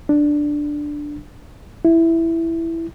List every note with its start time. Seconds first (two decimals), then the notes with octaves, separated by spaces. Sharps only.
0.09 D4
1.85 E4